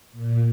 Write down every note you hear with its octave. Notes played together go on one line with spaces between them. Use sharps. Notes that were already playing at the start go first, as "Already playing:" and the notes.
A#2